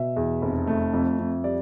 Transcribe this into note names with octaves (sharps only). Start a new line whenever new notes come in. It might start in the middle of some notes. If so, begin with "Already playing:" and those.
Already playing: B2 E5
E2
F1
A3
F2
F2
G3 D5